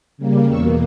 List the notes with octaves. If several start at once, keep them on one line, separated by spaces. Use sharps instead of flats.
C#3 G3 A#3
E2 B2 A#3 C#6 E6